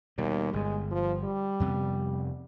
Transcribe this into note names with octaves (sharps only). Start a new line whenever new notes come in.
D#2 B2 G3
G1 G2 G#3
F3
G3
F2 C3 B3